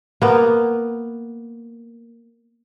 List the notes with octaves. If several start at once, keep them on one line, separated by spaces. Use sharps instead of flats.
A#3 B3